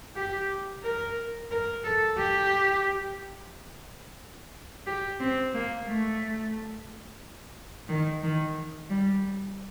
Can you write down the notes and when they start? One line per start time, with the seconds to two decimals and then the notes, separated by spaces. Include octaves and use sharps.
0.16 G4
0.84 A#4
1.51 A#4
1.84 A4
2.18 G4
4.87 G4
5.20 C4
5.54 A#3
5.87 A3
7.89 D#3
8.23 D#3
8.90 G3